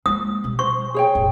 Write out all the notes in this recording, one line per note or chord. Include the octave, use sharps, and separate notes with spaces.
G#3 A#3 D#6
B2 G3
C5 C#6
G#4 C#5 G5
E1 A1